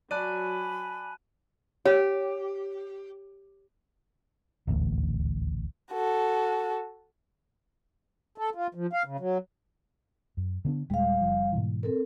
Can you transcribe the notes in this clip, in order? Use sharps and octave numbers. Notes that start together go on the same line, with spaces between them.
F#3 D5 G#5 A5 B5 F#6 D#7
G4 C#5
D#1 A1 D2
F#4 A4
A4
F4
F3
F5
C#3
F#3
F#2
D3 B3 D4
D#1 A#2 G3 G#3 F5
F#1 F3
G#2 B2 E3
C4 A4 A#4